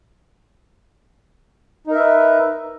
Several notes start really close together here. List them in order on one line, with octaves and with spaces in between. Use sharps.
D#4 A#4 E5 B4